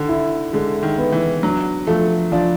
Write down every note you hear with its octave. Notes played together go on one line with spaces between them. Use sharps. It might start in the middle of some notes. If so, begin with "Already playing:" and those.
Already playing: D3 D#3
E4
D3 G#3
D#3
B3
E3
F#3 D4
F3 A3
F3 D4